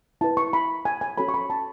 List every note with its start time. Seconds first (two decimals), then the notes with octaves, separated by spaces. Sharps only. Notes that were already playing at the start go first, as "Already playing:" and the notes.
0.21 E4 B4 A5
0.37 C#6
0.53 B5
0.85 G#5
1.01 G#5
1.18 C#4 F#4 A4 C#5 B5
1.29 C#6
1.34 B5
1.50 A5